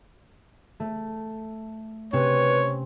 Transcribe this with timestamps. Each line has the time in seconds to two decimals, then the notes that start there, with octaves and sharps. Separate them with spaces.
0.80 A3
2.13 C3 C4 C#4 B4 C#5